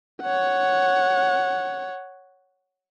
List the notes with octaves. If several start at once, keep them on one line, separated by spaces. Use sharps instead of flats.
C#5 F#5